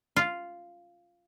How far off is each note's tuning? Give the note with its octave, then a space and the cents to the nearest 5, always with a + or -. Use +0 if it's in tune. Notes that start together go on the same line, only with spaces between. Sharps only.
F4 -5